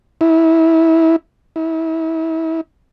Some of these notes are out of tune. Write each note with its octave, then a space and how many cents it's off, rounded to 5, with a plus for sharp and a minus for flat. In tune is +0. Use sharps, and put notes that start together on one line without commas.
E4 -20
E4 -30